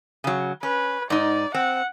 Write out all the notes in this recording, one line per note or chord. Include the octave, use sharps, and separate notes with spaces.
C#3 F#3
C#4 B4
G#2 D#4 D5
C4 F#5